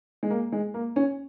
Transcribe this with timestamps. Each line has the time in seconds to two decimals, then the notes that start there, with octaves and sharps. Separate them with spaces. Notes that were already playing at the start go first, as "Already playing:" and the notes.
0.23 G#3
0.30 A#3
0.52 G#3
0.74 A#3
0.96 C#4